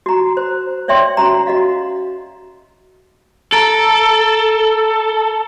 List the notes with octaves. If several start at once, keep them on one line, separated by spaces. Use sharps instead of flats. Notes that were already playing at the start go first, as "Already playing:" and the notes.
F#4 A#5
C5
C#5 D5 E5 G5 C6
C#4 F#4 A#5
F#4 D#5 F5
A4 A#5 A6 D7